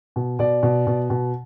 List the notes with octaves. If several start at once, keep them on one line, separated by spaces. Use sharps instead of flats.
B2
B2 D5
B2
B2
B2